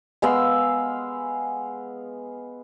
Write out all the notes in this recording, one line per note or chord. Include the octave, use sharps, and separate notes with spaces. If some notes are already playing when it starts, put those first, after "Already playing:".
G#3 B3 F5 E6